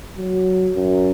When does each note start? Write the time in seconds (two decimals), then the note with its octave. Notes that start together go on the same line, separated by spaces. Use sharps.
0.18 F#3
0.75 F#2